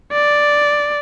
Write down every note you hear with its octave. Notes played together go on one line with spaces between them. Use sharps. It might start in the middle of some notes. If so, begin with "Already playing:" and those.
D5